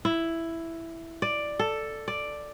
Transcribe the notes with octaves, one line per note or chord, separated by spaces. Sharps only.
E4
D5
A4
D5